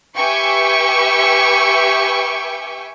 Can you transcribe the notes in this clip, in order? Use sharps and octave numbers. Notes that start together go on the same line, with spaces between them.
G4 B4 E5 G5 G#5 C#6